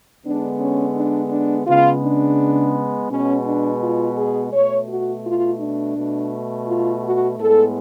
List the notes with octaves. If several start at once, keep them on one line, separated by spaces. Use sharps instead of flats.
D3 G#3 B3 D4
C#4
D4
D4
C#3 G#3 B3 F4
D4
B2 G#3 B3 C#4
D4
F4
G#4
B2 A3 C#5
F#4
F4
D4
B2 A3
F4
F#4
A2 G#3 B3 A4